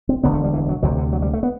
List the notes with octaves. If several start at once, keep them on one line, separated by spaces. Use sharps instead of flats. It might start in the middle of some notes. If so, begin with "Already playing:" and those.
C4
E1 D2 D3 B3
A3
G3
E3
F#3
D2 C3 F#3
D3
F#3
G3
A3
B3